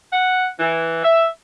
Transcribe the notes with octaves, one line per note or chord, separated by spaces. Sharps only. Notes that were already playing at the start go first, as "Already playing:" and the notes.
F#5
E3
E5